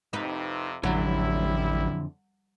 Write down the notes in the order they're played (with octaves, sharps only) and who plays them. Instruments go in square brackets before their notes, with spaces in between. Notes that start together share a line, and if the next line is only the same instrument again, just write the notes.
[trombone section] F2 C3 [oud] D#4 B4
[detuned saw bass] A1 [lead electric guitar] F2 D3 [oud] F#3 [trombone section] G3 E4